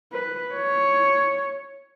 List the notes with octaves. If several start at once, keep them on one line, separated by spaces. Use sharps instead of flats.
B4
C#5